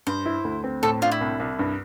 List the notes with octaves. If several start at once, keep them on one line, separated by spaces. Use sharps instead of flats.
G2 C5
E4
D2
C4
A2 A4
D4 F4
E4
C2
C2
G2